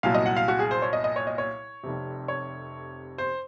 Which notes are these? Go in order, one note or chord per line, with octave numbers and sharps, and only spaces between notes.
C2 A#2 F#3 F5
D#5
F#5
F5
F#4
G#4
C5
C#5
D#5
D#5
C#5
D#5
C#5
F1 F2 C3
C#5
C5